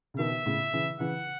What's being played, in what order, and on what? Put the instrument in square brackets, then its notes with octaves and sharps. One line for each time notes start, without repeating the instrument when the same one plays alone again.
[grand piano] C#3
[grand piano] B2 D#3 [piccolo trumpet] E5
[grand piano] A2 C#3
C#3 E3
[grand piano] C#3 E3 [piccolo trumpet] F#5